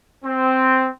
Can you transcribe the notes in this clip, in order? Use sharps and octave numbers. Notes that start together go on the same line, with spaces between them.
C4